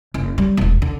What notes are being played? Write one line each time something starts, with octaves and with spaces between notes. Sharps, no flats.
F#1
G3
E1 B1
D3